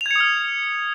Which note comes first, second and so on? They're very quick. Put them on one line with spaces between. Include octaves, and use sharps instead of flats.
F7 G#6 C#7 D#6 F6